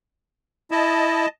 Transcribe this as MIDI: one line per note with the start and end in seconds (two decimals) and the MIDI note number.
0.71 1.26 64
0.71 1.28 75
0.71 1.28 81